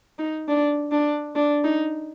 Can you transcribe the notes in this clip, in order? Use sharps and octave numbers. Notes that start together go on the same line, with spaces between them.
D#4
D4
D4
D4
D#4